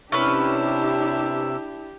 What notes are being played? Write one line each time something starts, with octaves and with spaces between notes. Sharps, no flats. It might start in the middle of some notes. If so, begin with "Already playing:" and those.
C3 C#4 D4 E4 G4 B4 E6